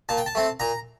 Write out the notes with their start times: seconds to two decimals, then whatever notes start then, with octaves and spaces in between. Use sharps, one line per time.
0.09 A#2 A5
0.17 G5
0.26 A5
0.35 A3 C4
0.60 A#2 A#5